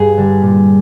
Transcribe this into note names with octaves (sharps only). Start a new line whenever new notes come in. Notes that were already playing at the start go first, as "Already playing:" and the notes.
Already playing: G2 G#4
D3 G3
A#2